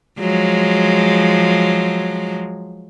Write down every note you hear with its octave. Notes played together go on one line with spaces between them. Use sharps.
F3 F#3 G#3